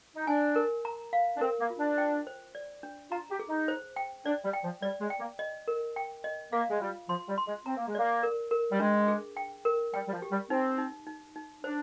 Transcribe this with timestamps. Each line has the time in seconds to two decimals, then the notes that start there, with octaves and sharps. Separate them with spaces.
0.16 D#4
0.27 D4 G#5
0.56 A#4
0.85 A#5
1.13 F5
1.37 D4
1.41 C4 A#4
1.60 A#3
1.70 F4
1.79 D4
1.98 G5
2.27 C5
2.55 D5
2.83 D4
3.11 F4 A#5
3.31 G4
3.39 G#4
3.49 D#4
3.68 C5
3.96 G5
4.26 D4 D5
4.44 G3
4.53 G5
4.64 F3
4.82 G3 D5
5.01 G#3
5.10 G5
5.20 A#3
5.39 D#5
5.68 A#4
5.96 G5
6.24 D#5
6.52 A#3 F5
6.70 G#3
6.81 G3 F4
7.09 F3 C6
7.28 G3
7.38 C6
7.47 G#3
7.66 C4 A#5
7.77 A#3
7.88 G#3
7.95 A#3 D5
8.23 A#4
8.51 A#4
8.72 G3
8.80 G#3 D4
9.08 G#4
9.37 G5
9.65 A#4
9.94 G3 G5
10.08 G3
10.13 F3
10.22 G4
10.32 G3
10.50 C4 D#4
10.78 D#4
11.07 D#4
11.36 D#4
11.64 D4 C5